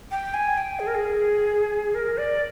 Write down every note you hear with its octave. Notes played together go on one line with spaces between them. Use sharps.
G5
G#5
G5
G#4
A#4
G#4
A#4
D5